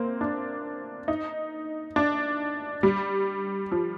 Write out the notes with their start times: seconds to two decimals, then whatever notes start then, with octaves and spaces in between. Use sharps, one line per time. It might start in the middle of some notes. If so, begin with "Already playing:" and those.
Already playing: A#3 C4
0.21 D4
1.08 D#4
1.96 D4
2.83 G3
3.72 F3